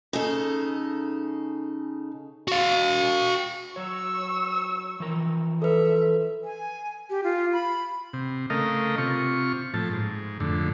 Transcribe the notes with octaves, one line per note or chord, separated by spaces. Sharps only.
C#3 D#4 A4
F#4 F5
F#3 C#5 C#6 E6
E3 F3 A#4
A4 B4 E5
G#5
G4
F4
B5
C3
C#3 A3 A#4 D#5 F5
C3 F4 C#6
A2 F3 A5
G#2
F2 A2 D3